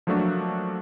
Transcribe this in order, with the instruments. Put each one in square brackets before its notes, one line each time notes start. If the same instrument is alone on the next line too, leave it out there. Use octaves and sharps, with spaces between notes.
[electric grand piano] F3 F#3 A3 A#3 D4 F#4